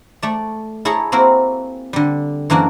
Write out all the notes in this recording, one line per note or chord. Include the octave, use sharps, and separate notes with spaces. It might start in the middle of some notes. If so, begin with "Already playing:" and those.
A3 D5
E4 G#4 A4 C#5 A#5
A#3 C4 E4 F#4 A#4
D3 G3
F#2 E3 A#3 D4 F#4